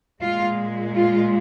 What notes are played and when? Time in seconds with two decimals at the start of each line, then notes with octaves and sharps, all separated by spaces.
0.21 A#2 G#3 F4
0.95 F4